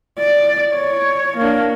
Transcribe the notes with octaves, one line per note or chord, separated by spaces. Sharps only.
D5
C#5
A#3 D4